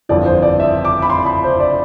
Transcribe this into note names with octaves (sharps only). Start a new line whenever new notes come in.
G1 F2 E3 D5
C5
D5
E5
D6
B5
C6
B5
C5
D5